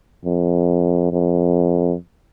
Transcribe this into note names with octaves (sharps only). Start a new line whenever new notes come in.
F2
F2